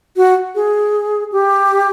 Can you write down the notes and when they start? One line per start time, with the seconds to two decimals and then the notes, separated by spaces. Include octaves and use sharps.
0.17 F#4
0.55 G#4
1.32 G4